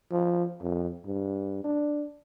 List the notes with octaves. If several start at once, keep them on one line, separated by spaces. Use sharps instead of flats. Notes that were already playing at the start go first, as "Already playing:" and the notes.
F3
F2
G2
D4